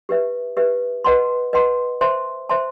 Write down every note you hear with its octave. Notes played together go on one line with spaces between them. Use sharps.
G4 B4 E5
G4 B4 E5
B4 D#5 F#5 A5 C6
B4 D#5 F#5 A5 C6
C5 E5 A5 C6
C5 E5 A5 C6